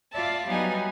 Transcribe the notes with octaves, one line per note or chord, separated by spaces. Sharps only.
F4 D5 E5 A5
F#3 G3 B3 D#4 G#5